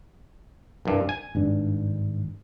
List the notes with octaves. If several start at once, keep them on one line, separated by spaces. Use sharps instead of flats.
C2 G2
G#5
G#1 G2 D4